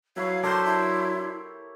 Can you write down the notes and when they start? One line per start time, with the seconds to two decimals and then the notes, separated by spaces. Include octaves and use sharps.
0.16 F#3 E4 B4 C#5 F5
0.44 D4 G4 A4 A#4 C5 C6
0.66 E4